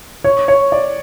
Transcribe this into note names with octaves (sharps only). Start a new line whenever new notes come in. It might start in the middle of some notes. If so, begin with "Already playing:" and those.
C#5
C#5
D5